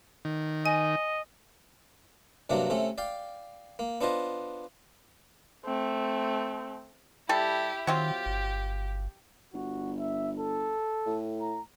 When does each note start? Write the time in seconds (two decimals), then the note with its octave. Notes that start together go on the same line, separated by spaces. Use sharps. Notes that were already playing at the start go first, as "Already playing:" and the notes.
0.25 D#3
0.66 D#5 G#5
2.50 G2 C3 F#3 A#3 D4
2.70 C3 A3 C#4
2.98 D5 F5 G5
3.79 A#3
4.01 B3 D4 F4 C5 D#5
5.66 A3 C4
7.29 G3 E4 G4 A4
7.87 D#3 F#3 C4 F4 G4
8.26 G1
9.54 G1 F#4
9.99 E5
10.39 A4
11.06 A2
11.41 A#5